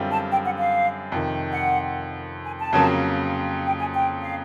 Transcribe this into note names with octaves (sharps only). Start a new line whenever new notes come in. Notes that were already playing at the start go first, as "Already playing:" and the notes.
Already playing: F#2 D3 G3 C4 F4
A5
G5
F#5
F5
F2 C3 D#3
F#5
G#5
A5
F2 C#3 F#3 A#3
G5
G#5
G5
F5